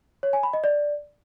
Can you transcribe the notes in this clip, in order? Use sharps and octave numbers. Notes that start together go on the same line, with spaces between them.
C#5
G#5
B5
D#5
D5